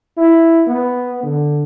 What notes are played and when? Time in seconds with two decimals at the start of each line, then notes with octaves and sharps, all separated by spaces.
0.17 E4
0.67 B3
1.23 D3